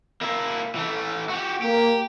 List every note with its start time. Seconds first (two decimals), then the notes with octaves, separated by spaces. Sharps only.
0.21 A#3 E4
0.75 E3 A3
1.30 F#4 G4
1.62 A#3 G4